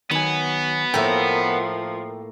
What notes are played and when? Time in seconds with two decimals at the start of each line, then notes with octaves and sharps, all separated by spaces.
0.11 D#3 F#3 B3 G#5 B5
0.94 A2 F3 A#3 E5 G5